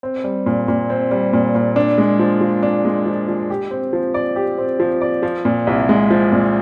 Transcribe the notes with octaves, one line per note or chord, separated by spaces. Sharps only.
C4
G3
A#2
A#2
C4
G3
A#2
A#2
D4
G#3
F3
F3
D4
G#3
F3
F3
G4
C4
F3
D5
G4
C4
F3
D5
F3
A#2
C2
G#3
F3
A#2